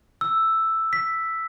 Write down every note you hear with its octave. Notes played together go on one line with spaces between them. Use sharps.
E6
B6